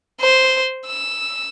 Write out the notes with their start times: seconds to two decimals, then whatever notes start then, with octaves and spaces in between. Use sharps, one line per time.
0.21 C5
0.86 E6